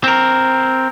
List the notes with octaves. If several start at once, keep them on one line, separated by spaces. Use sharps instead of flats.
C4 A#4